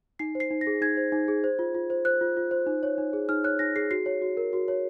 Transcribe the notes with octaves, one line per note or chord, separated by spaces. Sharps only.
D#4 C7
C5
C7
D#4
A#6
G#4
D#4 G#6
C5
D#4
G#4
C5
F4
F4
C5
C5 F#6
F4
F4
C5
D#4
C#5
D#4
G#4
D#4 F6
C#5 F#6
D#4 A#6
G#4 C7
F#4 C7
C#5
F#4
A#4
F#4
C#5